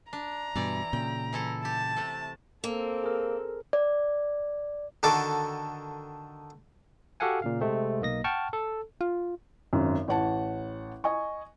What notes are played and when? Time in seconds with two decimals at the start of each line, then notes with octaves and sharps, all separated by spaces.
0.13 D4 A#5
0.56 G2 B2 E3 E4 D5
0.93 A#2 C#3 G5
1.33 E3 E4 A4
1.65 G4 A5
1.97 C3 A3
2.64 A#3 C4 A4
3.04 G#4 A#4
3.73 D5
5.03 D3 D#3 F#4 A4 D6
7.20 F#4 G4 A4 F5 F#5 G#5
7.42 A#2 C#3 F5
7.61 C3 G#3 A3 C4
8.01 B1 A#3 D#5 A#6
8.24 F#5 G5 A5 C#6 F6
8.53 A4
9.01 F4
9.73 G#1 F#2
10.08 A1 C#5 F#5 A5
11.04 D#5 G#5 C#6